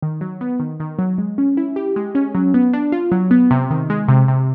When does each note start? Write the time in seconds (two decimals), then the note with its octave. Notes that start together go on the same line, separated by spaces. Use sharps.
0.02 D#3
0.21 F#3
0.41 B3
0.60 D#3
0.80 D#3
0.99 F#3
1.18 G#3
1.38 C#4
1.57 E4
1.76 G4
1.96 G#3
2.15 C#4
2.35 F#3
2.54 B3
2.73 D4
2.92 F4
3.12 F#3
3.31 B3
3.51 C3
3.70 D#3
3.90 G#3
4.08 C3
4.28 C3